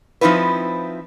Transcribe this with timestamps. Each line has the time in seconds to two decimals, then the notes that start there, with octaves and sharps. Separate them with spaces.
0.21 F3 C4 D#4 E4 B4